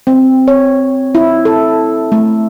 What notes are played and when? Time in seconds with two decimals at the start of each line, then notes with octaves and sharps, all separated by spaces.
0.07 C4
0.48 C#5
1.15 E4
1.45 A4
2.12 A3